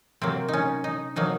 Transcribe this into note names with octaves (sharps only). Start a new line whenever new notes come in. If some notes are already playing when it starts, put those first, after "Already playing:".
C3 F#3 A#3 C4
C#4 D#4
D#4
C3 F#3 A#3 D#4